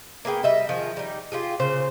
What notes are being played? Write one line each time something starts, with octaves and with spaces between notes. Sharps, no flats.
A#3 B3 G#4 G5
G3 D#5 E5
D#3 F3 G#4
G3 D#4
F4 G4 G#4
A#2 C#3 C5